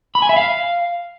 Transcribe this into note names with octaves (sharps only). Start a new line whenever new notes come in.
B5
G#5
E5
F5